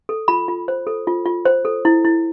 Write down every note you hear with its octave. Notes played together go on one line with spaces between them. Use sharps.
A4
F4 B5
F4
C5
A4
F4
F4
C5
A4
E4
E4